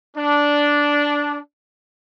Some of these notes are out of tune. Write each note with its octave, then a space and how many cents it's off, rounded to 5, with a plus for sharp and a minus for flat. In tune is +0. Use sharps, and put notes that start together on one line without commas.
D4 -10